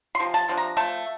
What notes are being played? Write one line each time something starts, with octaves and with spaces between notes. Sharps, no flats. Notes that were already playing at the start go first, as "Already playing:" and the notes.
C6
C3 F3
A5
C3 F3 D4
A#5
F3 A3 A5